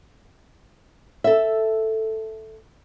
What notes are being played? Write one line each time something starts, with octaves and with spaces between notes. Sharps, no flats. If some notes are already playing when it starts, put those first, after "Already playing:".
A4 E5